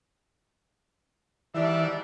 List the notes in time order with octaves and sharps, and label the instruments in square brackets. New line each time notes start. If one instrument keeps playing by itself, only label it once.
[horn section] G#2 G3 D4 [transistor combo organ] E3 E5